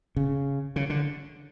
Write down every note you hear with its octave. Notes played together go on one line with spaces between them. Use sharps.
C#3
C#3
D3